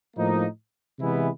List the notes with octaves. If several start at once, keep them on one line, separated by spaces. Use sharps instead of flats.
A2 F3 A#3 D#4
C3 E3 G#3 B3 E4